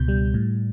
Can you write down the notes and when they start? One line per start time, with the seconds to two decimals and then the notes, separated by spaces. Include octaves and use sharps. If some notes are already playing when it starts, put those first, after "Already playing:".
Already playing: C#2 B2 G6
0.08 G3
0.34 A2